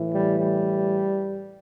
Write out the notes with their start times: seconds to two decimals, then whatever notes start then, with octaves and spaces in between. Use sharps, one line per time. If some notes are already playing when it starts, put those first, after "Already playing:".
Already playing: A2 E3
0.11 G3
0.39 G3